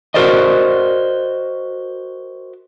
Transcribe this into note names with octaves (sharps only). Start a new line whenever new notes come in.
F#4 A#4 C5 D5 D#5